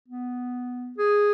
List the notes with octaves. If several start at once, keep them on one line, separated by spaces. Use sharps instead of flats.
B3
G#4